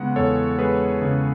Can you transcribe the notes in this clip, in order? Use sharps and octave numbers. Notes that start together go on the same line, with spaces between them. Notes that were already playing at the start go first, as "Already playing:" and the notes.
Already playing: C#3 G#3 B3 F#5
E2 A4 C#5
G#3 G#4 B4
C#3